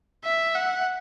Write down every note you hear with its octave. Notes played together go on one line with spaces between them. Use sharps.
E5
F#5